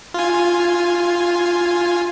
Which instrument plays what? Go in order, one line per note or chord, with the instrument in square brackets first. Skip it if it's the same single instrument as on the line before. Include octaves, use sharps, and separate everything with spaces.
[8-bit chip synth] F4 G#5